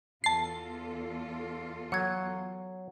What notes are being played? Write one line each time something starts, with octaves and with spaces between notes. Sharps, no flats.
E2 F4 A4 A5 C7
F#3 F#5 G#6